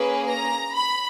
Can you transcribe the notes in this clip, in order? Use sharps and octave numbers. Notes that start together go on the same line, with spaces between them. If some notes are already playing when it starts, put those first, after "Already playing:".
Already playing: A#3 C#4 G#4 B4
A#5
B5